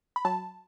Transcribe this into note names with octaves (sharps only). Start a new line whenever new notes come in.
B5
F#3 A5